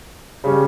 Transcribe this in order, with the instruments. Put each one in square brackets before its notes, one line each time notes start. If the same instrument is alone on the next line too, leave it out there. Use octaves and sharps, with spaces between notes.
[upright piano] C#3 G3 C#4